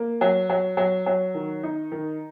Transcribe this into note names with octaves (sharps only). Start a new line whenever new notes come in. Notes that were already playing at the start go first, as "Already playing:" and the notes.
Already playing: A#3
F#3
F#3
F#3
F#3
D#3
D#4
D#3